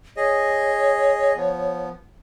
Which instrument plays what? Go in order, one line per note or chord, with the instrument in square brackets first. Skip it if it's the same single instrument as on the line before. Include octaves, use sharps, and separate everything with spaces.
[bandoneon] G#4 D#5 [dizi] C#5
[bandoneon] F3 B3